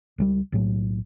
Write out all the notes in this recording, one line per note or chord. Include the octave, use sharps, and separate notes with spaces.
C#2 F#3 G3
B1 A2 F#3